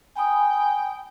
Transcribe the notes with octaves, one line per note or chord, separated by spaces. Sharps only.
G5 G#5 B5 D#6